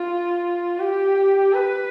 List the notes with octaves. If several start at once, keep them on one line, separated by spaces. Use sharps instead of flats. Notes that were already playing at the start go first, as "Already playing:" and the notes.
Already playing: F4
G4
B4